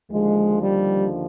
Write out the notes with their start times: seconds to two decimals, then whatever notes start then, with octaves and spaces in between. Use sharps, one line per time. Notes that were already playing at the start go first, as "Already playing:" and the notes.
0.11 D#2 D3 F3 G#3
0.61 G3